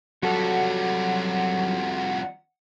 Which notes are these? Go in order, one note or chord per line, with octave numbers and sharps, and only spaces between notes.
F2 F#3 G3 F#4 A4 F#5